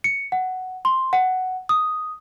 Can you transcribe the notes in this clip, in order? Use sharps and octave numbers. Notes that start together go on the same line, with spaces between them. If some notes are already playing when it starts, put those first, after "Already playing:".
C#7
F#5
C6
F#5
D#6